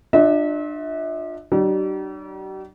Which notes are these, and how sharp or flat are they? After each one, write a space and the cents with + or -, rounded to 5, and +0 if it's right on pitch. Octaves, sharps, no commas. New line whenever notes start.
D4 +30 F4 +25 E5 -35
G3 -45 D4 +40